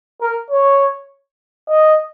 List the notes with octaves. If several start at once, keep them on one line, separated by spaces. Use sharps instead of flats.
A#4
C#5
D#5